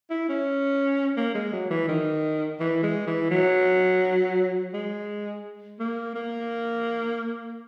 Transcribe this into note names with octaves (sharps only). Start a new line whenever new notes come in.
E4
C#4
A#3
G#3
F#3
E3
D#3
E3
G#3
E3
F#3
G#3
A#3
A#3